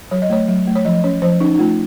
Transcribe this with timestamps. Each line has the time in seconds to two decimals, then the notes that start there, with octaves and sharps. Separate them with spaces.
0.11 F#3 C#5
0.22 D#5
0.30 A3 C#5
0.48 F#3
0.67 A3
0.75 C#5
0.85 F3 D#5
1.04 C#4 C#5
1.22 F3 C5
1.40 C#4 D#4
1.54 D#4
1.59 A3 F4